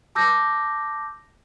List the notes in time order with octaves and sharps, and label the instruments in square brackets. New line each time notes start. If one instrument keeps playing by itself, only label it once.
[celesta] A5 D6 E6 G6 A#6